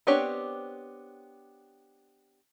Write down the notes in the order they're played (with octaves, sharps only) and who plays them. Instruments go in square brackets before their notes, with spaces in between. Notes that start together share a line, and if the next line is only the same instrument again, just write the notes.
[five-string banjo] B3 C4 D4 G4 C#5